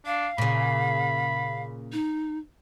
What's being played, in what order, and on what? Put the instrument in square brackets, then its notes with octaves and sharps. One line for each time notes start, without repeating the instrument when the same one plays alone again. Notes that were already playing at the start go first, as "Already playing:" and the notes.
[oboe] D4 [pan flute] F5
[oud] A#2 C#3 [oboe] B5
[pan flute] D#4